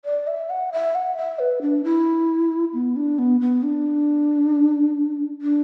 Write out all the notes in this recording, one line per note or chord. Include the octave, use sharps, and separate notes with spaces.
D5
E5
F#5
E5
F#5
E5
B4
D4
E4
B3
D4
B3
B3
D4
D4